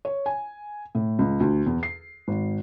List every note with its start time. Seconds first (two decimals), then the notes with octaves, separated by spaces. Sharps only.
0.05 C#5
0.26 G#5
0.95 A2
1.19 C#2
1.40 D2
1.66 E2
1.83 C7
2.28 G#1